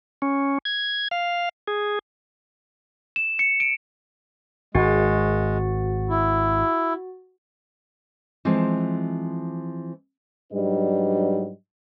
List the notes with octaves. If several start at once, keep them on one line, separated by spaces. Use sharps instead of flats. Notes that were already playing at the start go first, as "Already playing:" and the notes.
C#4
G#6
F5
G#4
E7
C#7
D7
G#1 G#3 F#4 F#5 A6
E4
E3 F3 G#3 C4
G#2 F#3 G3 D4 B4 D#5